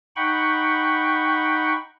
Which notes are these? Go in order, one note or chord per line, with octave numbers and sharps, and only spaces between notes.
D#4 F#5 G5 B5 C#6